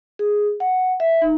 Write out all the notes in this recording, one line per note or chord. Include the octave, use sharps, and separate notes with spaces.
G#4
F#5
E5
D#4